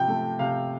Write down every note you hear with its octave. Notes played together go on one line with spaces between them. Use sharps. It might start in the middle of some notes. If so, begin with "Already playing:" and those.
Already playing: C3 F3 G5
A3
C3 F5